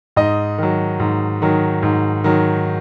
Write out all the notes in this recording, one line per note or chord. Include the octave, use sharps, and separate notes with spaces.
G#2 D#5
D#3 F#3
G#2
D#3 F#3
G#2
D#3 F#3